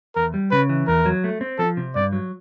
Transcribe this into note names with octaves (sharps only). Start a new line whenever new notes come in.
E2 A#4
G3
C#3 B4
E3
E2 A#4
F#3
A3
C4
F3 A4
C3
G2 D5
F#3